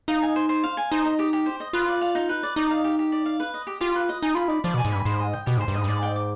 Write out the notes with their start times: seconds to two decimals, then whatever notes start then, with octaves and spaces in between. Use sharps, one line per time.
0.08 D#4 F5
0.23 G#5
0.36 C5
0.49 C5
0.63 F5
0.77 G#5
0.92 D#4 C5
1.05 D#5
1.19 G4
1.33 G4
1.46 C5
1.60 D#5
1.73 F4 B4
1.88 D5
2.01 F5
2.15 D#4
2.29 B4
2.43 D5
2.56 D#4 D5
2.71 F5
2.84 G4
2.99 G4
3.12 D5
3.26 F5
3.40 B4
3.54 D#5
3.67 G4
3.81 F4 G4
3.95 B4
4.09 D#5
4.22 D#4 G#5
4.35 F4 B5
4.48 D#4 D5
4.64 F3 D5
4.74 B2
4.78 G#5
4.85 G#2
4.92 G2 B5
5.05 G#2 C5
5.19 D#5
5.33 G5
5.46 B2 G4
5.57 G#2
5.61 C5
5.68 G2
5.75 G#2 D#5
5.84 G2
5.88 G#2 D5
6.03 G5
6.16 D6